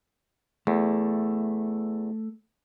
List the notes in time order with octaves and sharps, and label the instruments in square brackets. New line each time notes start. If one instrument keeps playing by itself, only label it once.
[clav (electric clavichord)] E2 [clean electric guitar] A3